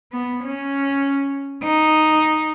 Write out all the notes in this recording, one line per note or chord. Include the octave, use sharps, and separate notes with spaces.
B3
C#4
D#4